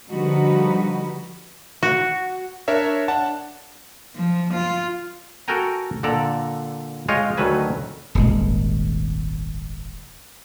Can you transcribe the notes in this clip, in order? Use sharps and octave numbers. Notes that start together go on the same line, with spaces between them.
D3 F3 G3 D#4 F#4 B4
F#4
D4 A#4 C#5 E5
D4 F#5 A5
F3
F4
F#4 A4 A#4 G5 G#5 A#5
A#2 D3 A4 D5 A#5
G#3 F4 C#5 D#5 G5
D2 D#3 F#3 A4 B4 G#5
D#1 G#1 G#3